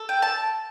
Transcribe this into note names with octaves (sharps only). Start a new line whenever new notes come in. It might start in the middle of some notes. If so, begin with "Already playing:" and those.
Already playing: A4
G5
A5